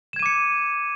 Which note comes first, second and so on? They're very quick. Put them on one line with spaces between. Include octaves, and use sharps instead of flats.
E7 G#6 D#7 D6 C#7